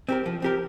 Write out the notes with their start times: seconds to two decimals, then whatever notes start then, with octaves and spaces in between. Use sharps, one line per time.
0.09 C4 G4 A#4
0.26 F3
0.42 C4 G4 A#4